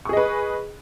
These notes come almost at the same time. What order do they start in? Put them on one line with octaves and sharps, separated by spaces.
C#6 G#4 D#5 B4